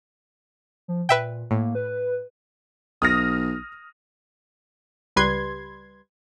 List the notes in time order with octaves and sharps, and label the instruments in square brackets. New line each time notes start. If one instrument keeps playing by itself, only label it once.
[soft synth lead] F3
[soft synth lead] A#2 [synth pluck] B4 E5 G5
[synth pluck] A2 [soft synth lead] A#3
[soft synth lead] B4
[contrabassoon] B1 [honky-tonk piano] D#6 F6 A#6
[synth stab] C#2 G3 B4 C6 G#6